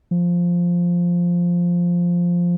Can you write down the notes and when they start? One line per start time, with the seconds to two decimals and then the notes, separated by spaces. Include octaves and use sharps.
0.11 F3